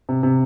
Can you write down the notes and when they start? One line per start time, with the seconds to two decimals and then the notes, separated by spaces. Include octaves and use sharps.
0.09 C3
0.23 C3